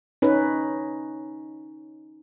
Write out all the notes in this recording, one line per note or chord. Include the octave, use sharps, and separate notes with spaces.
C#4 D#4 B4